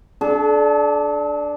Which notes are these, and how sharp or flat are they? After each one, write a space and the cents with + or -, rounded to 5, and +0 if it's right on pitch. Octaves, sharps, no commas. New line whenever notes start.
D4 +0 A4 -45